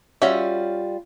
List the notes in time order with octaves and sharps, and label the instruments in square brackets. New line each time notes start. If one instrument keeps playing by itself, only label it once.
[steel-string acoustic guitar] G3 F4 [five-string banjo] C#4 F#4 E5